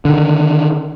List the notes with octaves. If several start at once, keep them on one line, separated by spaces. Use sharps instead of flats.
D3 D#3